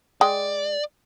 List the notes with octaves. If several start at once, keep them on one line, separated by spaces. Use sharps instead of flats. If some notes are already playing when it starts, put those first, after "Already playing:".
G#3 D5 G5